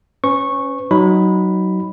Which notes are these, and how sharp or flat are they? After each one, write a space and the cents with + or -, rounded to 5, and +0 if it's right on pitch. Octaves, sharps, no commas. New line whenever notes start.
C#4 +0 B4 +40 C#6 -10
F#3 +20 D#4 +0 B5 +0